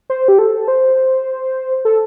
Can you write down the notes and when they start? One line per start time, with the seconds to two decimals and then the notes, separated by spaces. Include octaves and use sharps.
0.10 C5
0.28 G4
0.39 A4
0.68 C5
1.85 A4